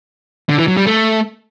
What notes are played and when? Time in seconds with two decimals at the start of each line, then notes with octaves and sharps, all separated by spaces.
0.49 D3
0.58 E3
0.68 F#3
0.77 G3
0.86 A3